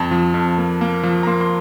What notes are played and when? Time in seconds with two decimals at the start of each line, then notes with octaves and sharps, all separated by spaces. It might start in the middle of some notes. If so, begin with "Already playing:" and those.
Already playing: F2 A5
0.11 F3
0.34 F2
0.58 A#3
0.81 A#3
1.03 F3
1.23 A#5
1.27 A#3 C6
1.41 C6